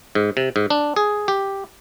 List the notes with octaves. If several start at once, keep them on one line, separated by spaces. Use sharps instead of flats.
G#2
C3
G#2
D4
G#4
G4